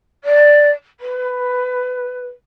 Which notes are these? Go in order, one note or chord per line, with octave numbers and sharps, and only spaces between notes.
D5
B4